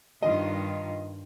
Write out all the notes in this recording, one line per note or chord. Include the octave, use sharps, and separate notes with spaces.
G2 D#3 F4 D#5